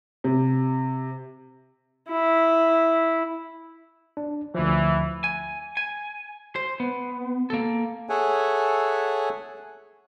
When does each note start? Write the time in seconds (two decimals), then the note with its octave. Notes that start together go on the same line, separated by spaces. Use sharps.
0.24 C3
2.10 E4
4.17 D4
4.55 D2 E3 F3
5.24 G#5
5.77 G#5
6.56 C5
6.80 B3
7.50 A#3 A4
8.09 G#4 A4 C#5 E5 F#5 G#5